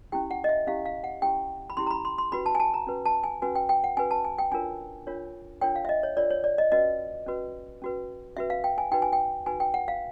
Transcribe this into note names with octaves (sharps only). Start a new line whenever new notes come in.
C#4 E4 G4 G5
F#5
D#5
E5
C#4 E4 G4 F5
F5
F#5
C#4 E4 G4 G5
B5
C#4 E4 G4 C6
A#5
B5
C6
C6
C#4 F#4 B4 B5
A5
G#5
A5
A#5
C#4 F#4 B4
A5
G#5
C#4 F#4 B4 G#5
G5
G5
F#5
C#4 F#4 B4 G#5
A5
G#5
G5
D4 F4 A#4 C#5 G#5
D4 F4 A#4 C#5
D4 F4 A#4 C#5 G5
F5
E5
D#5
C#5
D4 F4 A#4 C#5 D5
C#5
D5
D#5
C#4 F#4 B4 D#5
C#4 F#4 B4
C#4 F#4 B4
C#4 F#4 B4 E5
F5
G5
G#5
D#4 F#4 B4 G5
G#5
G5
D#4 F#4 B4 G#5
G5
F#5
F5